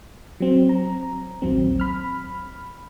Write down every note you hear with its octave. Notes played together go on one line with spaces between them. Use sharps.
F#3 C4
A#5
A#1 D#2 F#3 C4
B5 F6